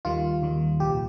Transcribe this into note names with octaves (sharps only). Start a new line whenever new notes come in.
D#2 D#3 G3 F4
D#2 D#3 G3
C2 A#2 F3 G4